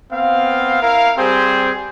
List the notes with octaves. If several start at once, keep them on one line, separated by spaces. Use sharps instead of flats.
B3 C4 F5
E4 A#4 F5
G3 C4 G4 G#4 C5